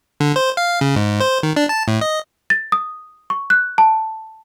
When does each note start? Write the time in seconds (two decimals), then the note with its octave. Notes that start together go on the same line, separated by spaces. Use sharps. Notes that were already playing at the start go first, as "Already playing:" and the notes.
0.20 D3
0.36 C5
0.57 F5
0.81 C#3
0.96 G#2
1.20 C5
1.43 D#3
1.56 D4
1.69 A5
1.88 A2
2.01 D#5
2.50 A6
2.72 D#6
3.30 C#6
3.50 F#6
3.78 A5